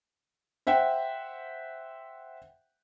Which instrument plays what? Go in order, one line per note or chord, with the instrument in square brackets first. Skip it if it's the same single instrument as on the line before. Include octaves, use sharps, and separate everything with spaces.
[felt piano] C5 E5 F#5 G5